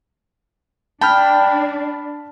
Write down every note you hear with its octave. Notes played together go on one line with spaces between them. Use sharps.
D4 G5 A5 B5 F6